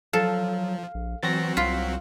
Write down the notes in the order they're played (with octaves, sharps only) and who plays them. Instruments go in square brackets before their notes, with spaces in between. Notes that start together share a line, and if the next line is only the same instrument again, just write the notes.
[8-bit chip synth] F3 [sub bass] F#3 [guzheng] A4 [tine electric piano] F5
[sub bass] A#1
[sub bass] E3 [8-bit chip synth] F#3 C4 F#4 [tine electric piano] A6 A#6
[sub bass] C2 [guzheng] F4 [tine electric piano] B6